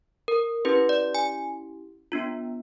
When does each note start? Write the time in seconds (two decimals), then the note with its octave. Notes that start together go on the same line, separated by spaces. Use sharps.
0.28 A#4
0.65 C#4 E4 G4 B4
0.89 D5
1.15 G#5
2.12 B3 D4 F4